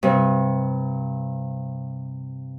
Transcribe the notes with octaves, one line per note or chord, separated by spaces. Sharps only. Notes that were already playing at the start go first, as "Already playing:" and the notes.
G2 C3